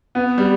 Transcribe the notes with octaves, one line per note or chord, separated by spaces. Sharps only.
B3
G3